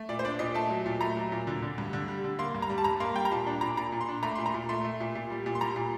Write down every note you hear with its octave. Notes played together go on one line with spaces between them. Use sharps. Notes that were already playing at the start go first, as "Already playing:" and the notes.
Already playing: A3
A#2 D5
C5
D4 D5
A#2 D#5
A3 A5
F#3
A#2
A3 A#5
F#3
A#2
D3
D3
G2
D3
G3
D3
A#3 C6
G2
A#5
G3
A5
G2 A#5
A#3 C6
G3 G5
A#5
A#2 A5
D4
A#2 A#5
A#2 A#5
A#2
C6
D4
A3 A#5
A#2 C6
A#5
A#2
A3 C6
A3
A#2
A#2
G3
A#2
C6
G3 A#5
A#2